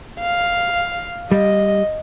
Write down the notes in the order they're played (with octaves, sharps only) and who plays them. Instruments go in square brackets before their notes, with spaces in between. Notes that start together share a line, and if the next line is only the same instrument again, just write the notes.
[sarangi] F5
[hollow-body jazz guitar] G3 [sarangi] D#5